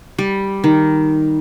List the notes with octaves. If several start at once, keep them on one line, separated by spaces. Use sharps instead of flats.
G3
D#3